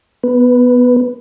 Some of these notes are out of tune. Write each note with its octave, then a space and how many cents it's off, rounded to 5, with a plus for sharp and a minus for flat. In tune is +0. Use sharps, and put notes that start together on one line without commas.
B3 +0 B4 +0